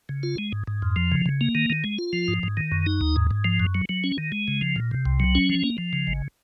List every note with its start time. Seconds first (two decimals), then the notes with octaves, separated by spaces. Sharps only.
0.09 C#3
0.23 F4
0.38 G#3
0.52 G#2
0.67 G#2
0.82 F2
0.96 F3
1.12 C#3
1.26 C#3
1.41 A#3
1.55 D#3
1.70 D#3
1.84 G#3
1.99 F4
2.13 F3
2.28 G#2
2.43 G#2
2.57 D#3
2.72 F#2
2.86 D#4
3.01 D#2
3.16 G#2
3.31 G#2
3.44 F3
3.60 F#2
3.75 F#3
3.89 F#3
4.04 C#4
4.18 D#3
4.32 G#3
4.48 C#3
4.61 F3
4.76 A#2
4.91 C3
5.06 C2
5.20 F#3
5.35 C#4
5.49 F3
5.64 A#3
5.78 F3
5.93 C#3
6.07 G#1